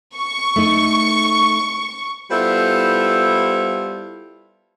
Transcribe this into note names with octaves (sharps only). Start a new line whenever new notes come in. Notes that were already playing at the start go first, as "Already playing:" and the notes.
C#6
A3 D#4
G3 B3 E4 F4 A4 C5